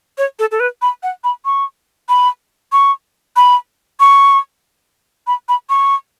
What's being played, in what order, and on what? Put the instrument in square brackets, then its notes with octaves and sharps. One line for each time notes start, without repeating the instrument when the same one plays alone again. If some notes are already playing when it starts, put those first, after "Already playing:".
[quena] C#5
A4
A4
B4
B5
F#5
B5
C#6
B5
C#6
B5
C#6
B5
B5
C#6